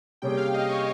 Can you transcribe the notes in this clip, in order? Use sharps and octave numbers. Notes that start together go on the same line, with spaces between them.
C3 G3 A#3 C#4 G#4 G5
F5
D#5
C#5